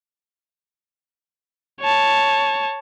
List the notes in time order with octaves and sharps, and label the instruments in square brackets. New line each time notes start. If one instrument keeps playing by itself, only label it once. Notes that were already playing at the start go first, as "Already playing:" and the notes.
[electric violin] C#5 A5